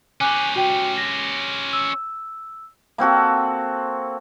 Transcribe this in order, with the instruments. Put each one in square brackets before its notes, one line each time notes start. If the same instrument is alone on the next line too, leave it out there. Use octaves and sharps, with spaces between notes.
[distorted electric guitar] C#4 G4 [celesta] G#5 D6 F#6
[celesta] F#4 G5
A#6
E6
[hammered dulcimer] A#3 C4 F#4 A4